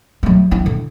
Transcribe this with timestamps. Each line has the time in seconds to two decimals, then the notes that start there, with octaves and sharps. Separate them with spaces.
0.23 F#3 A3
0.51 D4 E4
0.66 D3